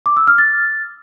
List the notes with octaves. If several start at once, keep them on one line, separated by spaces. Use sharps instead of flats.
D6
E6
F6
A6